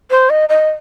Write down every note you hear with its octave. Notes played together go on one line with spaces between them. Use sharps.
C5
D#5
D#5